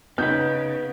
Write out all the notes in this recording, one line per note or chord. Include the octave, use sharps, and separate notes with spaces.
C#3 B3 D#4 B4 G6